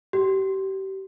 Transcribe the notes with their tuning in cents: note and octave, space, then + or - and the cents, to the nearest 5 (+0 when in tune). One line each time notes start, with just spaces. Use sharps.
G4 -30